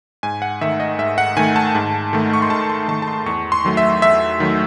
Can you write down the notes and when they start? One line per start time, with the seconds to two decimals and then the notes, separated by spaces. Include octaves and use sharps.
0.23 G#2 G#5
0.42 F#5
0.61 D#3 A3 E5
0.80 D#5
0.99 G#2 E5
1.18 F#5
1.37 D#3 A3 G#5
1.56 A5
1.75 G#2
2.13 D#3 A3
2.33 C#6
2.42 C6
2.50 G#2 A5
2.61 C#6
2.70 C6
2.88 D#3 A3 A5
3.02 A5
3.08 C6
3.26 E2 C#6
3.52 C6
3.64 D#3 F#3 A3
3.77 E5
4.02 E2 E5
4.40 D#3 F#3 A3